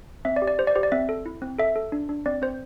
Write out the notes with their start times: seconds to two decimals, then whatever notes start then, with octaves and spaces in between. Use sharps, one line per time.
0.25 C4 E5
0.36 D5
0.42 G4
0.47 D5
0.58 G4 C5
0.67 D5
0.75 G4 C5
0.83 D5
0.92 C4 E5
1.09 A4
1.26 E4
1.42 C4
1.59 A4 E5
1.76 A4
1.92 D4
2.09 D4
2.26 C4 D5
2.42 C4 C5